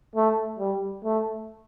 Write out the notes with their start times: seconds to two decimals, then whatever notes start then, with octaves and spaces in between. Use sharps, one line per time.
0.16 A3
0.59 G3
1.05 A3